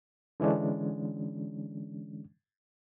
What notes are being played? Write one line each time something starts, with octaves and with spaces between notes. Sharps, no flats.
D3 E3 G#3 C#4 D4